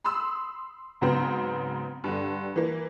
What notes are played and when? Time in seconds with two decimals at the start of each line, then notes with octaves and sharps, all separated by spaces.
0.04 B5 C6 D#6 E6
1.01 G#2 C#3 F#3 B3 C4
2.04 G2 D3
2.56 E3 A#3